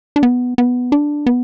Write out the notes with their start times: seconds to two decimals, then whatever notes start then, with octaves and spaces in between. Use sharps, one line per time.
0.16 D4
0.23 B3
0.58 B3
0.92 D4
1.26 B3